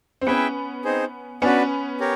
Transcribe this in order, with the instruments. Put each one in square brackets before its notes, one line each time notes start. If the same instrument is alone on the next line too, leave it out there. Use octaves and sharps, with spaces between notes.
[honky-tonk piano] C4
[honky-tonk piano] B3 C#4 [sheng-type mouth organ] E4 G#4 B4 E5 G5
[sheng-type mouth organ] C4 D#4 G#4 C5
[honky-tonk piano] B3 C#4 [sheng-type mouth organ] D4 F#4 B4
[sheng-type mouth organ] G4 A#4 C#5